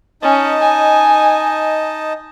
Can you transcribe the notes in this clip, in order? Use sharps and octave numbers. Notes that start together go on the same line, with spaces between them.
C#4 D#4 D#5 A5
G#5